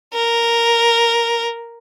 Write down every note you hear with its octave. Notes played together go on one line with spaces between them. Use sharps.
A#4